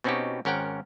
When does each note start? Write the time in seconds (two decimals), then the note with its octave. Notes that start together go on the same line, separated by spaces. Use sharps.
0.04 B2 C4 C#4 D#4 F#4 G4
0.45 G#1 C#4 A#4 F#5 G5